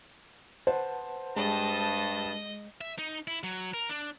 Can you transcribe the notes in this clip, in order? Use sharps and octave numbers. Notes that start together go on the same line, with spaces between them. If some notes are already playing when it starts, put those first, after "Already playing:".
B4 C5 F#5 A5
G2 G#3 D#5 A5
E5
D#4
E4
F#3
A#4
D4